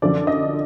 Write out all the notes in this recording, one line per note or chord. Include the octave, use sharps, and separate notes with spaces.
F#2 D3 F3 D5
D#5